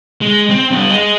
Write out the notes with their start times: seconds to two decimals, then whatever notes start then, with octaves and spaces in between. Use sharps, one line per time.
0.21 G#3
0.50 C4
0.71 G2 B3
0.90 G#4 D#5